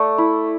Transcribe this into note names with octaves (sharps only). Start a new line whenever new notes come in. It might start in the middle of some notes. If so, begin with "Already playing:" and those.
Already playing: A3 D5
E4